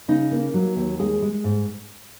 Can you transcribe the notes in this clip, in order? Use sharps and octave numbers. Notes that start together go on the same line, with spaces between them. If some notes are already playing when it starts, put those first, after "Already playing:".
C#3 D#4
A#3
F#3
D#2
G#3 G#4
G#3
G#2